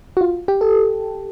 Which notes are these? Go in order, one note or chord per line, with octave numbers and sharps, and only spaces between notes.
F#4
F4
G4
A4